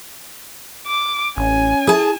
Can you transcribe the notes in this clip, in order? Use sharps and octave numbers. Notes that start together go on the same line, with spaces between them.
D6
A1 C#4 G#5
E4 G#4 A5